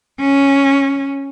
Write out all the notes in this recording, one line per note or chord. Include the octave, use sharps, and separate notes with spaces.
C#4